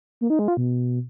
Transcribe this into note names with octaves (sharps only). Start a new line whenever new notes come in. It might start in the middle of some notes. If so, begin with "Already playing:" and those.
A#3
D#4
G#3
F4
B2